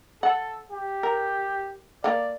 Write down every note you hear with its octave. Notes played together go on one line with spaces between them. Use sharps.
A4 F#5
G4
A#4
A#3 A4 D5 F5